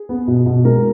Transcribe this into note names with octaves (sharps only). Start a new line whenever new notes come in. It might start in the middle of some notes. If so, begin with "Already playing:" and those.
Already playing: G#4
B3
B2
B2
G#3 A#4